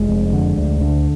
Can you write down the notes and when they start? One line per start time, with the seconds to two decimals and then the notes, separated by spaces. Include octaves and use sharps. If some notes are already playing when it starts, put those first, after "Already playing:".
Already playing: F1 G#3
0.09 F2
0.33 D3
0.57 D2
0.81 D3